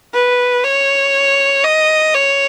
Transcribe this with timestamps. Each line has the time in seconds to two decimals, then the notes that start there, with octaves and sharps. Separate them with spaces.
0.14 B4
0.64 C#5
1.64 D#5
2.15 C#5